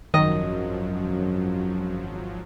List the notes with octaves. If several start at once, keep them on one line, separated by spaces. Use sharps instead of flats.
G#1 F#2 D#3 F3 F#3 D#5